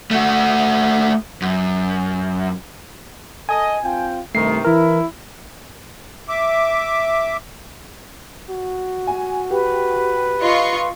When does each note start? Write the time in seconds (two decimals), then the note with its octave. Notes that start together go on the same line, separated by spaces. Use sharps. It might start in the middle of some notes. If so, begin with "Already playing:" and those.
0.11 A3 F#4
1.42 F#2
3.49 A4 D#5 G#5
3.82 C4 F4 G5
4.35 G2 C3 D#3 A3 C7
4.65 E3 E4 A#4
6.29 E5 D6
8.49 F#4
9.07 G#5
9.50 G4 B4
10.42 F4 D#5 C#6